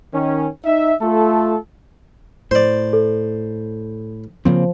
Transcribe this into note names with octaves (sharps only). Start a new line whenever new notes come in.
D#3 C#4
D#4 E5
A3 F4 A4
A2 C5 D5
A4
C#3 F3 A#3 C4